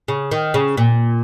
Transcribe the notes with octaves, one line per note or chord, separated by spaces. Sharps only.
C#3
D#3
C#3
A#2